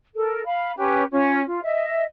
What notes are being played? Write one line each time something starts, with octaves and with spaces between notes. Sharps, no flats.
A4 A#4
F5 B5
C#4 G4 B4
C#4 F4
F4
D#5 E5